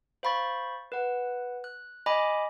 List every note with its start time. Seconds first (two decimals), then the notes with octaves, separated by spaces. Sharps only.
0.23 C5 F5 B5 C#6 A6
0.92 B4 F#5
1.64 F#6
2.06 D#5 G#5 B5 D6